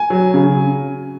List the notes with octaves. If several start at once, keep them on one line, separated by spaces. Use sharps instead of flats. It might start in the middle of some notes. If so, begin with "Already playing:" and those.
Already playing: G#5
F#3
C#3